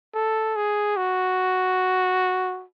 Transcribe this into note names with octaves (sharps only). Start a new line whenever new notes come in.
A4
G#4
F#4